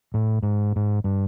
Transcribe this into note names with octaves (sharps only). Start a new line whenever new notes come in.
A2
G#2
G#2
G2